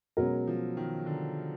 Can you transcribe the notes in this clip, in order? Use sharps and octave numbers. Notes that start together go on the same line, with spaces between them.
B2 F#3 G#3 C#4 F#4 A#4
F3
D#3
D3